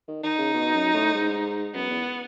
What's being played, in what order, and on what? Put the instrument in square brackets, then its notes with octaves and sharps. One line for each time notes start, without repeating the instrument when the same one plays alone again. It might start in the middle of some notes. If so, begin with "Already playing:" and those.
[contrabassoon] D#3
[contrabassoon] D#3 [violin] D#4
[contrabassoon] C#3
B2
F#2
A2
G#2
[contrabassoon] F#2 [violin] B3
[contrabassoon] E2